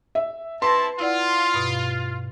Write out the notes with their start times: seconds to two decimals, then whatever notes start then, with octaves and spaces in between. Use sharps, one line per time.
0.15 E5
0.62 C4 E4 B4 A5 C6 A#6
1.00 E4 F4 D5 F#5
1.54 G2 B2